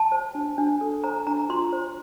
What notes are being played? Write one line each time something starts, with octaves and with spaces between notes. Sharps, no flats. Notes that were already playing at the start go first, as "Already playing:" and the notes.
Already playing: A5
C5
D4
D4
A4
C5 A#5
D4 A#5
F4 C6
C5